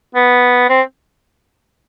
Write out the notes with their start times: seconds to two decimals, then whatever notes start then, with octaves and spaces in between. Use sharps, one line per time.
0.15 B3
0.70 C4